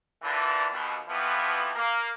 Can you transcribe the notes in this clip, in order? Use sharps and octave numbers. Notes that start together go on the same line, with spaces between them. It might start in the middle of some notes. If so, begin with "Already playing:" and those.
A#2 D3 E3
D#2 B2
F2 E3 F3 B3
A#3